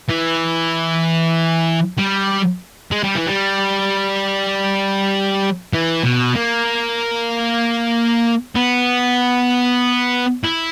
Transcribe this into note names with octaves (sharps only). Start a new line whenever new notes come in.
E3
G3
G#3
G3
E3
G3
E3
B2
A#3
B3
E4